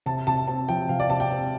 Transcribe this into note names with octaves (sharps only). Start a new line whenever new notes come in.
C3 A5
C3 A5
C4 A5
F3 G5
C3 F5
D5
C3 A5
G5
C4